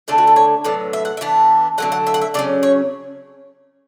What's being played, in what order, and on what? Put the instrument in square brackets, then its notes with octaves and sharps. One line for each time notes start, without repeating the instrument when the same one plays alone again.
[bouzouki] D3 A3 D4 A4
F#4
A4
C#5
A2 F#3 B3 D5
E5
F#5
E5
E3 B3 D4
D3 F#3 A3 F#5
F#5
E5
F#5
E5
C#3 F#3 C#4 D5
C#5